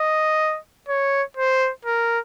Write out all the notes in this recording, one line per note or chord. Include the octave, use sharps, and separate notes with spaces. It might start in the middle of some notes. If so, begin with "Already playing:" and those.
Already playing: D#5
C#5
C5
A#4